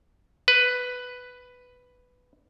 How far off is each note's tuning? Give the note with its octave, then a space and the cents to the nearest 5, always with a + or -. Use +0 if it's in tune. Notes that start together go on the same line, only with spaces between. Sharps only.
B4 +5